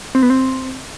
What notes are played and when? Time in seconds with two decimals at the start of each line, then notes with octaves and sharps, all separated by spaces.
0.15 C4
0.23 B3
0.30 C4